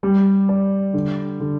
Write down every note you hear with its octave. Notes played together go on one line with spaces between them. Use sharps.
G3
D5
D3
D3